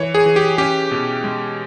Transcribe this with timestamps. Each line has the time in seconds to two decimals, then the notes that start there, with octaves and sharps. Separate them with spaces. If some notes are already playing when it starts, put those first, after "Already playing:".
Already playing: E3 C#5
0.14 G#4
0.26 E3
0.36 G4
0.58 C#4 G4
0.91 B2
1.24 G#3